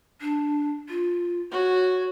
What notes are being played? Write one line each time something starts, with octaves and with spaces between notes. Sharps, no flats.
D4
F4
F#4 C#5